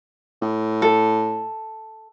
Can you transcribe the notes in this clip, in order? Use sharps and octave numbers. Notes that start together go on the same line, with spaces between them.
A2
A4